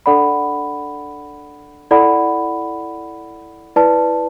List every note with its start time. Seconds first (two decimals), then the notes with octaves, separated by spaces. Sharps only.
0.06 D4 A4 D5 F#5 B5
1.91 E4 A4 D5 F#5 B5
3.76 E4 B4 D5 A5